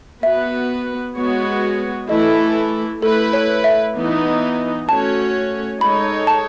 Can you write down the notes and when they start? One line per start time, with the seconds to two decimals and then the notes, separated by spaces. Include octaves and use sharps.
0.23 B3 F#4 B4 E5
1.17 G#3 B3 F#4 C#5
2.09 E3 A3 E4 A4 D#5
3.02 A3 E4 A4 B4
3.33 C#5
3.64 E5
3.95 E3 B3 D#4
4.89 A3 C#4 F#4 C#5 A5
5.81 G#3 D#4 A4 C#5 B5
6.27 A5